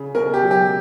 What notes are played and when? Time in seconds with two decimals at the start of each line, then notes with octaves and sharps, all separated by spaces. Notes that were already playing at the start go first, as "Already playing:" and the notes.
Already playing: C#3
0.15 B2 A#4
0.34 G4
0.42 F#3
0.51 G4